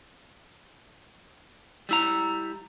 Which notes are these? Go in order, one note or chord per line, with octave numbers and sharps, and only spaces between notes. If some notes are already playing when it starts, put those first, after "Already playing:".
G3 E4 A#5